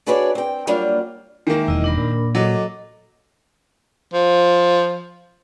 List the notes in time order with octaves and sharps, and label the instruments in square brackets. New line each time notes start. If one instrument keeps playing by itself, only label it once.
[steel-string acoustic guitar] D4 F#4 G#4 B4 C#5 D5
C4 G5
F#3 G3 A#3 D4 F4
[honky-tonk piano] D#3 A#3 [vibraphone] G#3 E5
[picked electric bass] E1 [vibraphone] E4 D#5
[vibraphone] D4 A#4 B5
[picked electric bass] A#2
[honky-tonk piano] F#3 [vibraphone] A4 D#5 D6
[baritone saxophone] F3